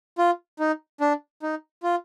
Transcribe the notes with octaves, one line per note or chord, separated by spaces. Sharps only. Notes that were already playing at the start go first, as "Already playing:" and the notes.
F4
D#4
D4
D#4
F4